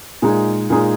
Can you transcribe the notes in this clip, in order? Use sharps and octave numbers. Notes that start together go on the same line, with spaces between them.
A#2 G#3 D#4 G#4
A#2 G#3 D#4 G#4